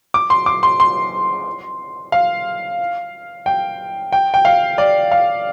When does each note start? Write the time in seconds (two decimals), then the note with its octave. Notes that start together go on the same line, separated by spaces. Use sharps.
0.14 D6
0.30 C6
0.46 D6
0.63 C6
0.80 C6
2.12 F5
3.46 G5
4.12 G5
4.34 G5
4.45 F5
4.78 D5
5.11 F5